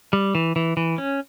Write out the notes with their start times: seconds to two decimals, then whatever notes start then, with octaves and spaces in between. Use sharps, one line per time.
0.13 G3
0.35 E3
0.56 E3
0.77 E3
0.98 C#4